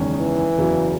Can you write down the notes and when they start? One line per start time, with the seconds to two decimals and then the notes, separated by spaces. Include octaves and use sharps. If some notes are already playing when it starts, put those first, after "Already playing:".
Already playing: F#1 E2 D#3 G#3 C#4
0.20 E3
0.57 F#1 E2 C#3 F#3